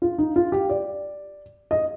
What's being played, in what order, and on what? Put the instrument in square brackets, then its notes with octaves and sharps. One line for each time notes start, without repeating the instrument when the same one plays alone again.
[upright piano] F4
D#4
F4
G4
D5
D#5